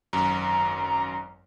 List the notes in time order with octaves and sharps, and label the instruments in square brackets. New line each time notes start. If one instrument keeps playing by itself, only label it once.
[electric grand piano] G#1 F#2 [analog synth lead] A#5